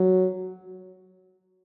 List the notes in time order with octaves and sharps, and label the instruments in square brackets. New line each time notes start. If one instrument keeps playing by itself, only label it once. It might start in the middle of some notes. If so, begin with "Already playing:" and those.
Already playing: [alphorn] F#3